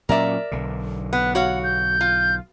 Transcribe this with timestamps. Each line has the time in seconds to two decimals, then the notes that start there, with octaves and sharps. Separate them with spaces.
0.09 A#2 F#3 C#4 A#4 D5 E5
0.52 B1 D3
1.13 B3 F#6
1.35 F#4 C#5 F5 F#5
1.64 G6
2.01 F4